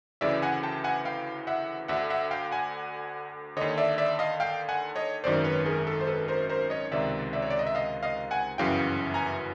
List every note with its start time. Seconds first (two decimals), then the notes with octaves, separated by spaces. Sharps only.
0.21 D2 C#3 E3 D5 E5
0.42 F#5 G#5
0.63 G5 A5
0.84 F#5 G#5
1.05 F5 G5
1.47 E5 F#5
1.88 D2 D3 E5 F#5
2.10 E5 F#5
2.31 F5 G5
2.52 F#5 G#5
3.57 D#2 D3 C#5 D#5
3.78 D5 E5
3.98 D5 E5
4.19 D#5 F5
4.40 F5 G5
4.69 F#5 G#5
4.96 C#5 D#5
5.24 G#1 F#2 D#3 C5 D5
5.44 B4 C#5
5.66 G#4 A#4
5.87 A4
6.01 C5
6.07 A4 B4
6.28 A#4 C5
6.49 A#4 C5
6.70 C#5 D#5
6.92 C#2 C3 D#3 D5 E5
7.33 D5 E5
7.42 C#5
7.50 D5
7.59 D#5
7.67 E5
7.75 D#5 F5
8.03 D#5 F5
8.31 F#5 G#5
8.58 G1 F#2 C#3 E3 F5 G5
9.14 G#5 A#5